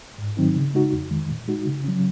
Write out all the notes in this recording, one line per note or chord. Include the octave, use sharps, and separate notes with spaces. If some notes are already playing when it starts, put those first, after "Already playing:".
G#2
D#3 F#3 C4 D#4
C#3
G#3 D#4 F#4
F2
D#3 G#3
A#2
G#3 D#4 F#4
C#3
F#3 C#4